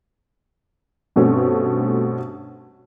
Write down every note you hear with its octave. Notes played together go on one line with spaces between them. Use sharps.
G2 B2 A3 C4 C#4